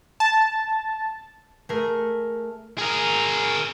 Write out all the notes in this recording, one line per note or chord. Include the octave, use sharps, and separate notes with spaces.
A5
A3 G#4 A#4
G#4 A#4